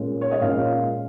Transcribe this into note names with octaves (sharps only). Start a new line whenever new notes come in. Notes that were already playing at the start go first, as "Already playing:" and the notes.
Already playing: A#2 G#3 C#4
C#5
D#5
A#2 G#3 C#4 F5